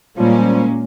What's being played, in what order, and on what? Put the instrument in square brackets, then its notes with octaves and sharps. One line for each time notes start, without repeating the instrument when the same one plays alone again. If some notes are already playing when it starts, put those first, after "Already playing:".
[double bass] A#2 [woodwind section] F3 G3 [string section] G#3 A#3 C#4